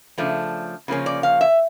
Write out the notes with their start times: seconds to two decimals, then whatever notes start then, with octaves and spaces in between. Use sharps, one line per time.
0.18 C#3 F3 A3 D4
0.88 C#3 F3 A#3 C#4
1.06 D5
1.23 F5
1.41 E5